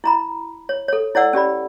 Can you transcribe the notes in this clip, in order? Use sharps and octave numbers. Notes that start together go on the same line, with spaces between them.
E4 A#5 B5
C#5
A4 C#5
E4 C#5 D5 F#5 E6
C#4 G4 D5 B5